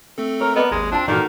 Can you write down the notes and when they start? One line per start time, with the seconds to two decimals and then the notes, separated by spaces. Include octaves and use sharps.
0.18 A3 C4 A4
0.41 A#4 C#5
0.56 B3 A#4 D5 D#5
0.71 G#1 D#2 G#3
0.92 C4 D4 F4 A5
1.08 G2 A#2 D#3 E3 A#3 F#4 A4 D5